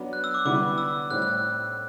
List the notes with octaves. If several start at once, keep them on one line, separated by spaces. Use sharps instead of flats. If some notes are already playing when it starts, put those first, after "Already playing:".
Already playing: F#3 B3 D4
F#6
E6
D6
D3 G3 B3 E4 D6
E6
A2 G3 C4 E4 F#6
F#6